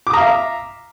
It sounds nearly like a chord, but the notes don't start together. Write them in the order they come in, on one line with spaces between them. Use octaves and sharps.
D6 D#6 A#5 F5 E5